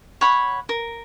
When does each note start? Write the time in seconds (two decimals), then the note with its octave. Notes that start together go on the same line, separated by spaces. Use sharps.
0.21 C#5 F#5 B5
0.69 A#4